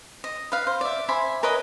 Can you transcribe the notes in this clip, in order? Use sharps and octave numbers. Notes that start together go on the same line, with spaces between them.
D#5
B4 F5
C5
D5 E5
C5 E5 G#5 B5
A#4 B4 C#5 D#5